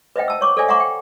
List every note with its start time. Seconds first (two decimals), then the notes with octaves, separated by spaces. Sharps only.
0.16 B4 C5 D#5 E5 F#5 G5
0.28 A5 E6
0.41 C#5 C#6 D6
0.57 A4 C5 D5 E5 G#5
0.68 E5 F#5 G#5 A#5 C#6 D6
0.80 G5